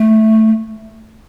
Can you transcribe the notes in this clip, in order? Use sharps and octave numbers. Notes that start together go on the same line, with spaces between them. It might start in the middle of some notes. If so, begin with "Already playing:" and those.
Already playing: A3